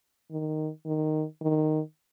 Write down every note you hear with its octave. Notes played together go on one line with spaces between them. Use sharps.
D#3
D#3
D#3